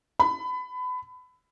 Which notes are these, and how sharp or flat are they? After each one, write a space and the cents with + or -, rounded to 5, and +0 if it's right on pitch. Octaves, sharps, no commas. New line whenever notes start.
B5 +25